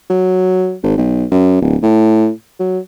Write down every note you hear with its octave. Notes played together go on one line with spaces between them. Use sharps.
F#3
G#1
B1
F#2
D1
A2
F#3